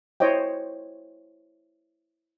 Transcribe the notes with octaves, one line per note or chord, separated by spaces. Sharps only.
E4 C5 C#5 D#5 G5